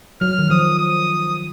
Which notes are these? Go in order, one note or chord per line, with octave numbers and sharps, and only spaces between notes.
F#3 F6
D#3
F3 D#6
D#6